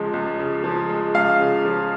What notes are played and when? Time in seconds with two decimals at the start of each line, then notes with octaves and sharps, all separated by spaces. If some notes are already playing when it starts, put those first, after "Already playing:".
Already playing: C#2 C#3 F3 G#3
0.14 C#2
0.39 C#3
0.64 F3
0.89 G#3
1.14 C#2 F5
1.40 C#3
1.65 F3